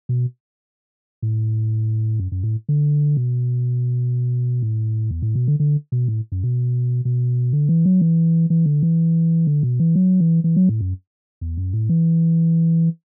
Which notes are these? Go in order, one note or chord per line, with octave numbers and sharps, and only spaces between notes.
B2
A2
F#2
F#2
A2
D3
B2
A2
E2
A2
B2
D3
D3
B2
A2
F#2
B2
B2
D3
E3
F#3
E3
E3
D3
E3
D3
B2
E3
F#3
E3
E3
F#3
A2
F#2
E2
F#2
A2
E3